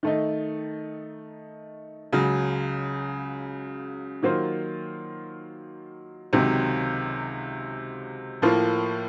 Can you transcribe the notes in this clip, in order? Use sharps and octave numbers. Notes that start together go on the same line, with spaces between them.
D#3 A3 D#4
C#2 C#3 F#3
D#3 F#3 A#3 F4 C5
C#2 C3 D#3 F#3 C4
A2 F3 A#3 F4